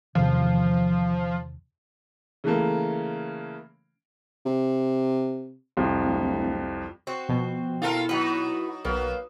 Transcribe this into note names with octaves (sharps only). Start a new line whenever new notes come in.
E2 C3 D#3 F3
C#3 E3 A3 A#3
C3
C2 F2
D1
C4 F#4
B2 F3
E4 F4 A4 A#4
F#3 D#4 F#4 B4
B1 F#3 A#3 B4